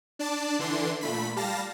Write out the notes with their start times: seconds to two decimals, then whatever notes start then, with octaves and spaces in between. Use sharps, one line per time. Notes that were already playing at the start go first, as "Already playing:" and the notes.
0.19 D4 D5 A5
0.59 D3 E3 D4 C6
1.01 A#2 A3 B5 B6
1.36 G3 F5 A5 A#6